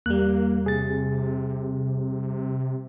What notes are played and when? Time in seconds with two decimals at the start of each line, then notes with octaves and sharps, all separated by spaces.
0.06 E2 G3 A#3 F#6
0.66 C3 G#4 A6